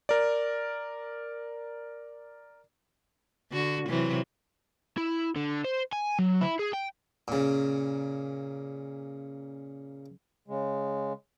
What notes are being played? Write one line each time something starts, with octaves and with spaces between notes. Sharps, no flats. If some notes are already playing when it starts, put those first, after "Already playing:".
A#4 D5
D3 F#4
C3 E3 F#3
E4
D3
C5
G#5
F#3
E4
G#4
G5
A#2 C#3
C#3 G#3